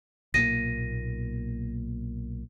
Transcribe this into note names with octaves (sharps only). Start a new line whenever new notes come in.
B1 A#2 A#3 A#6 D#7